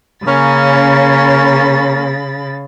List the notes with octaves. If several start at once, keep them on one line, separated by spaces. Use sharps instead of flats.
C#3 A#3 C#4 B5 A6